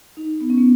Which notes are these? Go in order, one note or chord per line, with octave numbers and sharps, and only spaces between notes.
D#4
B3
C#4
B3